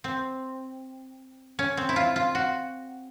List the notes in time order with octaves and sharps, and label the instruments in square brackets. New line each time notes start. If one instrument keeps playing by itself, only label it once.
[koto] C4
C#4
C4
E4
F4
F4
F#4